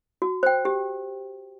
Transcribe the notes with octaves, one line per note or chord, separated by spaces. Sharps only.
F#4
C5 G5
G4